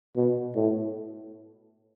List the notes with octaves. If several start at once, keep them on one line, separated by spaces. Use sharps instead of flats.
B2
A2